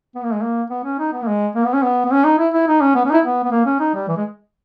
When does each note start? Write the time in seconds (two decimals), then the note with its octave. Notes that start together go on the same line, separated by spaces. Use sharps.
0.15 B3
0.24 A#3
0.33 G#3
0.42 A#3
0.70 B3
0.84 C#4
0.99 D#4
1.13 B3
1.22 A#3
1.28 G#3
1.55 A#3
1.65 B3
1.74 C#4
1.83 B3
2.05 B3
2.12 C#4
2.25 D#4
2.39 E4
2.54 E4
2.68 D#4
2.81 C#4
2.95 B3
3.05 C#4
3.10 D#4
3.14 E4
3.24 B3
3.44 B3
3.52 A#3
3.65 C#4
3.80 D#4
3.94 G3
4.08 E3
4.17 G#3